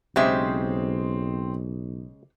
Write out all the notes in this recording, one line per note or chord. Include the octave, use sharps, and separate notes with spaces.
B1 C#3 G#3 C4 G4 C5 E5 C6